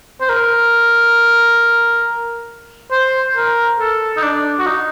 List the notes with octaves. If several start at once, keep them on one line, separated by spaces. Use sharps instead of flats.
C5
A#4
C5
A#4
A4
D#4
D4
F#4
D#4